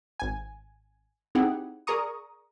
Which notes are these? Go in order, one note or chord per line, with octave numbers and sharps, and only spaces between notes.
G#1 G#5
C4 D#4 E4 G4 G#4 F#5
G#4 A#4 D5 A#5 C#6 D#6